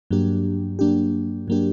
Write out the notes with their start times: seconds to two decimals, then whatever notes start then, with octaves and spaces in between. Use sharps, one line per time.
0.11 G2 F#3 A#3 D4 G4
0.79 G2 F#3 A#3 D4 G4
1.48 G2 F#3 A#3 D4 G4